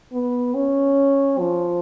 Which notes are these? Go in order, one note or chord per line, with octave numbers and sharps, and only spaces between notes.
B3
C#4
F3